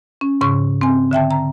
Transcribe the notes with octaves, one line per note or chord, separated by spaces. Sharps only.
C#4
G#2 C#3 C#6
C4 G#5
D3 E5 G5 A5
A#5